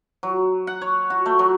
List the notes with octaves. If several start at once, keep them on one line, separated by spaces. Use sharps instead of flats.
F#3
F#5
C#5
F#4
A3
F#3